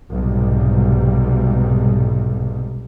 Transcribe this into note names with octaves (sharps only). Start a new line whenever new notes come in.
B1 G#2 C3 G3